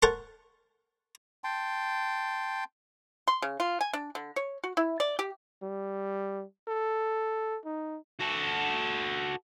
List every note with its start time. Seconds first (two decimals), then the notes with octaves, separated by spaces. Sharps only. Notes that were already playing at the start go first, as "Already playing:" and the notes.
0.02 A#4 C5 F#5 A5 C#6
1.44 G5 A5 C6
3.28 C6
3.42 C#3
3.60 F4
3.81 G#5
3.93 D4
4.15 D3
4.36 C#5
4.64 F#4
4.77 E4
5.00 D5
5.19 G4
5.63 G3
6.68 A4
7.65 D#4
8.20 F#4 A4